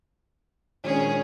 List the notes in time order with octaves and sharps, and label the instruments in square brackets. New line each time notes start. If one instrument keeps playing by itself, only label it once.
[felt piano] A#1 D#3 G#3 [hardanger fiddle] C#4 G#4